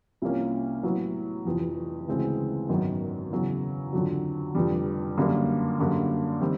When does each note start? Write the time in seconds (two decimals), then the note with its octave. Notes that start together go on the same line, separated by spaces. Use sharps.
0.22 C2 C3 F3 A#3 C#4
0.83 A2 F#3 B3
1.45 F1 F2 C3 E3
2.08 D2 C#3 E3 G#3 C4
2.69 G#1 F#2 D#3 F#3 B3
3.31 E2 C#3 F#3
3.93 F2 D3 F#3
4.55 F1 F2 D3 G3
5.17 F#2 D3 G3 A#3
5.79 F#2 D3 G3 A#3
6.40 D#3 G3 C4